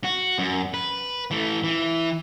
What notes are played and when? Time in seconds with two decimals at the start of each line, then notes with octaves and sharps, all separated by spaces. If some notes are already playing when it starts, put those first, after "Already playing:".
0.04 F#4
0.39 F#2
0.74 B4
1.31 E3 A3
1.64 E3